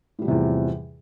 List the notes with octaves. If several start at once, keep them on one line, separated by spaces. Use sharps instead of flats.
E2 A2 C3 F3 G3